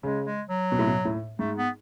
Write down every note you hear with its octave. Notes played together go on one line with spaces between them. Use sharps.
C#3 G#3
G#3
F#3
B2
A2
B2
A2
G#2 A3
B3